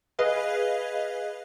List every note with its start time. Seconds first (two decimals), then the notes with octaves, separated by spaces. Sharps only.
0.19 G#4 B4 D#5 F5